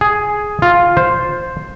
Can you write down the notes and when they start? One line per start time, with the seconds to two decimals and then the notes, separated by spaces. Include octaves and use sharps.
0.01 G#4
0.62 F4
0.97 C5